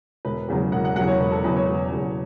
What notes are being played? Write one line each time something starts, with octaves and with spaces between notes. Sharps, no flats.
E1 B4
E2 C#3 F#3
E1 F#5
F#5
E2 C#3 F#3 F#5
C#5
E1 B4
A4
E2 C#3 F#3 B4
C#5
E1
E2 C#3 F#3